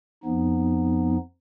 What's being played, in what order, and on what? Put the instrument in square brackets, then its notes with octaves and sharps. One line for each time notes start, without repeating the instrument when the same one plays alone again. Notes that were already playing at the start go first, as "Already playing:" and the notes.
[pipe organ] F2 F3 B3 D#4